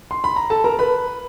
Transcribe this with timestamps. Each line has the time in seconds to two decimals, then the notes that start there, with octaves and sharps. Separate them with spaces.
0.11 C6
0.24 B5
0.36 A#5
0.50 A4 A5
0.64 A#4 A#5
0.79 B4 B5